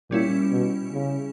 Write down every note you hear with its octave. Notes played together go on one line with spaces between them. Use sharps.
A#2 G3 C#4 E4
B2
C#3